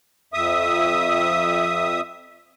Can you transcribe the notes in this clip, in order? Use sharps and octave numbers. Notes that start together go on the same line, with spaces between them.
F2 E5 D#6